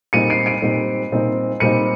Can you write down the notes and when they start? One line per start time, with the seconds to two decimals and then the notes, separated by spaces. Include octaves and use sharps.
0.13 A#2 G3 C4 D#4 C#7 D#7
0.30 C7 D7
0.46 C7 D7
0.62 A#2 G3 C4 D#4
1.12 A#2 G3 C4 D#4
1.60 A#2 G3 C4 D#4 C#7 D#7